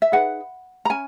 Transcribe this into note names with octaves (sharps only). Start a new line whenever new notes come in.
E5
D#4 G#4 B4 F#5
A#5
C#4 G#5